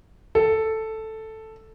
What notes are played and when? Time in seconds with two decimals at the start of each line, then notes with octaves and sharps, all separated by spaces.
0.35 A4